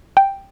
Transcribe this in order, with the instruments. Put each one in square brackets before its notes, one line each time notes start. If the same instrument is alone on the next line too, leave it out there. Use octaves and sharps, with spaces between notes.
[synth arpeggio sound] G5